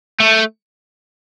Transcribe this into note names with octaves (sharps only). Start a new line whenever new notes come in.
A3